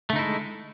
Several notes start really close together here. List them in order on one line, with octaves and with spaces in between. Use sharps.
A3 D3 D#4 E4 G#3